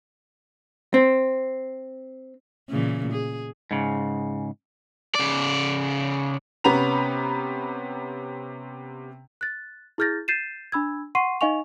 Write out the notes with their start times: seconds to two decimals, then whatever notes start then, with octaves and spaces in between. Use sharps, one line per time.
0.94 C4
2.70 A#2 C#3 E3
3.12 G#4
3.71 G#2 C#3
5.15 C#3 D5
6.64 C3 B3 C#4 A#5 B5 F7
9.41 F#6 A6
9.98 E4 G#4 F6 G6 A6 A#6
10.28 G6 A6 C7 D#7 E7
10.72 D4 B5 E6 G#6
11.15 F#5 C6 C#6 C7 D#7
11.41 D#4 D#5 F5 G#5 C#6 F7